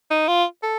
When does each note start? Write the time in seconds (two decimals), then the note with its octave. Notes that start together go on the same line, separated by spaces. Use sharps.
0.11 D#4
0.28 F4
0.63 A4